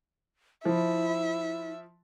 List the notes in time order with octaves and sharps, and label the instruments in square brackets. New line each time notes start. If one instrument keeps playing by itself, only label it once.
[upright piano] F3 [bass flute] E4 [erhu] E5